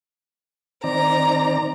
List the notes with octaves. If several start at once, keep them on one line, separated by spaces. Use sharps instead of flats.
D#3 C4 D5 A#5